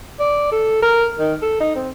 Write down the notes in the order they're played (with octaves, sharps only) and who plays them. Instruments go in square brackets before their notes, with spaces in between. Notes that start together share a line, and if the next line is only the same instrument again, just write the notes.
[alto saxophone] D5
A4
A#4
D#3
A4
D#4
C4